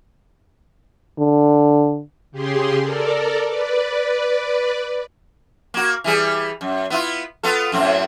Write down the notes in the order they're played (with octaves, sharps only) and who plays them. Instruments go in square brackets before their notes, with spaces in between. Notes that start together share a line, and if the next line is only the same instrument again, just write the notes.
[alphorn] D3
[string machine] C#3 G4 G#4 C6
A4 A#4 D5
B4 D5
[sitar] A#3 F#4
E3 G3 G#4
F#2
B3 E4 F4
B3 F4 A4
F#2 A2 C4